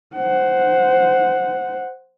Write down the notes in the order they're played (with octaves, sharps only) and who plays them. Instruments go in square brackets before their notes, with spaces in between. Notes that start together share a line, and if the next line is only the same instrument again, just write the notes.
[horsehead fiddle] C5 F#5